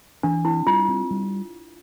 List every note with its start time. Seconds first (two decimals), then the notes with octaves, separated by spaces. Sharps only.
0.23 E3 D4
0.45 C4 E4
0.67 G3 F4
0.89 C4
1.11 G3